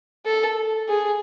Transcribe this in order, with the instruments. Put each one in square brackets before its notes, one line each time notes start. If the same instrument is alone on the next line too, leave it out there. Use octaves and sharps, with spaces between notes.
[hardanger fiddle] A4
G#4